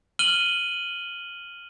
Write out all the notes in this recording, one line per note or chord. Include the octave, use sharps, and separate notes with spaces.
F6 D#7 F#7 G7